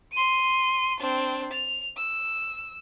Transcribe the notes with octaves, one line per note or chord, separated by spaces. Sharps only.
C6 D#7
C4 D4
F7
E6